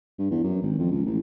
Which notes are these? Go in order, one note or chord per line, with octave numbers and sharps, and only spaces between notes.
G2
E2
F#2
G#1
F2
C#2
A1